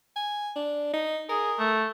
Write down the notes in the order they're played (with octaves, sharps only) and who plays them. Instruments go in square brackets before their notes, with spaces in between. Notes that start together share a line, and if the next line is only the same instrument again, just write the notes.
[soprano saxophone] G#5
D4
D#4
[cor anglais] G#4 [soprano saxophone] A#4
[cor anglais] A3